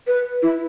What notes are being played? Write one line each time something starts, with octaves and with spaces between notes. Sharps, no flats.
B4
E4